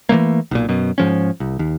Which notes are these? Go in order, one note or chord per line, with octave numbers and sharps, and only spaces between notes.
E3 F#3 A3 A#3
B1 A#2
F#2 B2
G#2 F3 C#4
C2
D#2